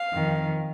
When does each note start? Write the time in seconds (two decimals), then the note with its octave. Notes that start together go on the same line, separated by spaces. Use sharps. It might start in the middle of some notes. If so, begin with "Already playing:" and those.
Already playing: F5
0.12 F2 D#3